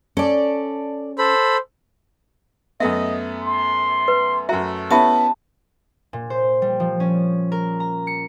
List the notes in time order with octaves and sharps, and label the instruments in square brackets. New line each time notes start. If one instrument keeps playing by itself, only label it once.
[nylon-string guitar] C#4 [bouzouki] A4 D5
[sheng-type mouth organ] A4 B5 [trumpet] C5
[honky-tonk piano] F#2 A3 B3 [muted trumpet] D#5 [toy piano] E5
[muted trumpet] C6
[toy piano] B4
[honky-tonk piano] F#2 F#4 [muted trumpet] A3 [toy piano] E5 A#5
[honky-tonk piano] B3 C#4 E4 [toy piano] G4 E5 B5 [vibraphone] A5
[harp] A#2
C5
G3
F3
C#4
A#4
A#5
C#7